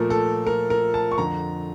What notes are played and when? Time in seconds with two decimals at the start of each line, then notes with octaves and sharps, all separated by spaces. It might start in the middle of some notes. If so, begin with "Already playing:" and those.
Already playing: A#2 F3 A3 A#4
0.10 A4
0.47 A#4
0.70 A#4
0.94 A5
1.12 C#6
1.18 F2 D3 F3 A#5